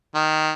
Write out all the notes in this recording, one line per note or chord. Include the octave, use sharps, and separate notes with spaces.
D#3